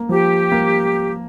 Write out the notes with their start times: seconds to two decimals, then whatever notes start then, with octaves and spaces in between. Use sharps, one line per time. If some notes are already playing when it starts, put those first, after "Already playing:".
Already playing: A#3
0.09 F3 G4
0.52 A#3